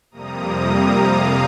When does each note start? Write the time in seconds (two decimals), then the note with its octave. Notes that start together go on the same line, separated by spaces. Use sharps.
0.11 F2 C3 G3 A#3 A#5 D#6
0.87 F5 A#5